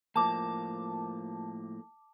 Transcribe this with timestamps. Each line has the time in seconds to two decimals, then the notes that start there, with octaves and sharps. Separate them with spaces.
0.16 A2 F3 A#3 A5 D6